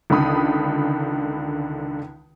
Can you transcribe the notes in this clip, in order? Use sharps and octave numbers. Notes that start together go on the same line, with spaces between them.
C#2 D3 D#3 B5 D#6